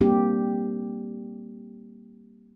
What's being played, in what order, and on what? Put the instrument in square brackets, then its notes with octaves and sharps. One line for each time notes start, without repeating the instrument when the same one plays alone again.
[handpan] G3 A#3 C4 D4 G4